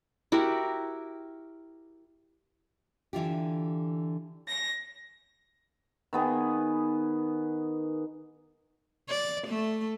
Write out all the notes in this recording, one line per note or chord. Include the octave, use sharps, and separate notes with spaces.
E4 F#4 G4 A#4
D3 E3 F4 G4
A#6
D#3 B3 G#4
D5
A3